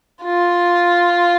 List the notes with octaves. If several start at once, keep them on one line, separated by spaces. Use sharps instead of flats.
F4